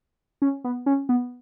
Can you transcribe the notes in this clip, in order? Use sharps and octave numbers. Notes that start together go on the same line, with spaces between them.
C#4
B3
C#4
B3